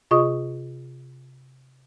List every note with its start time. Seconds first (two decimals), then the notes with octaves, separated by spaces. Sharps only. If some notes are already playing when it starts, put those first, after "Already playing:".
0.11 C3 F4 G#4 D#5 C#6 D#6